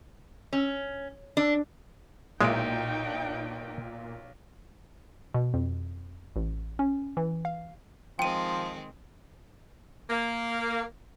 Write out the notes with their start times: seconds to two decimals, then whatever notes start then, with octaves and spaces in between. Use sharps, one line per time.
0.53 C#4
1.37 D4
2.41 B1 A#2 G#3 D#4 E4 G5 D7
5.34 B2
5.54 F2
6.36 A1
6.79 C#4
7.17 E3
7.45 F5
8.19 D#3 F3 G#3 C4 G5 D#7
10.10 A#3